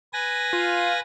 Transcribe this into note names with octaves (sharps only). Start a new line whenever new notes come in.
B4 G#5 A#6
F4